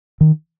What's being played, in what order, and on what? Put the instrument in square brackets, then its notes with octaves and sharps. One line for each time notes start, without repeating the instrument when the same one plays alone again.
[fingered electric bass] D#3